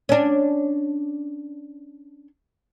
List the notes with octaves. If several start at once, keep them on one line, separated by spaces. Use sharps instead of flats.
C#4 D4